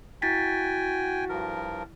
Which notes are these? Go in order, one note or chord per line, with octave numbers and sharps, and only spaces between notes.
E4 F#4 G5 G#5 A6 B6
G2 F3 A#4